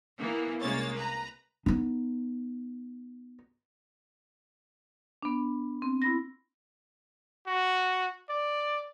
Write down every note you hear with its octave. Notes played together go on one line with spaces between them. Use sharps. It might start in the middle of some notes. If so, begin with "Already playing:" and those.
E3 A#3 B3
C2 G#3 A#3 C#4 C#5 A6
B4 A#5
B3 D#4
B3 D4
C4
E4 B5 A#6
F#4
D5